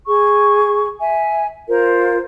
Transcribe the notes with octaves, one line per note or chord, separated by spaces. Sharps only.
G#4 C#6
E5 G#5
F4 A#4 C5